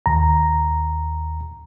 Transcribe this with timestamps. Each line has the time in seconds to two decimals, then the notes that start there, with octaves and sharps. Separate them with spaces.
0.06 D#2 A#5